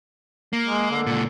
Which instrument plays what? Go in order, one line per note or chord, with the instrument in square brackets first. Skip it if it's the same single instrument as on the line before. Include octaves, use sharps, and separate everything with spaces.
[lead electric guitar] A#3
[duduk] G#3
D3
[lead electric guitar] C#2 A#2